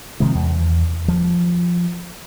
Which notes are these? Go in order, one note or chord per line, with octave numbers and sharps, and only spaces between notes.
C3 D#3 F3 G#3
E2
F3